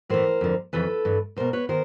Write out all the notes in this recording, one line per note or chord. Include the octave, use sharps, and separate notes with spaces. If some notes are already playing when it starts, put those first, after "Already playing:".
A2 E3 A#4 C5
F2 D3
F2 C#3 E3 A4 B4
G2 E3
E2 B2 A#4 C5
B4 C#5
D#3 A#4 C5